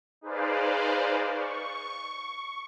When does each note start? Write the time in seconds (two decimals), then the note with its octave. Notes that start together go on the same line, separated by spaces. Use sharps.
0.21 D#4 G#4 B4 C5 D5 F5
1.33 C#6